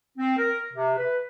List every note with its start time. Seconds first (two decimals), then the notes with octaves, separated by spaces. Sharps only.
0.18 C4
0.37 A#4
0.73 C3
0.96 B4